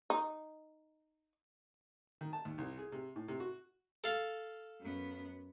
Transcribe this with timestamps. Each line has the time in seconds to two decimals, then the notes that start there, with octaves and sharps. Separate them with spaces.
0.10 D#4
2.21 D#3
2.33 A5
2.45 D#2
2.58 C2
2.78 G#4
2.92 C3
3.16 A2
3.28 C3
3.40 F#4
4.04 A4 F5
4.81 F#2 B3